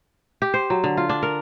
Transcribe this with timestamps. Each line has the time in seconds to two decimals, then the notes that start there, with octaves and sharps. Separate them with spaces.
0.42 G4
0.54 C5
0.70 F#3
0.84 D3
0.97 F4
1.09 D4
1.23 A#4